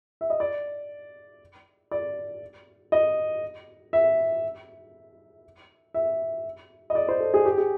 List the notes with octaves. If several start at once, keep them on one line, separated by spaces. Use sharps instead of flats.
E5
D#5
D5
D5
D#5
E5
E5
D#5
D5
C5
A4
G#4
G4
G#4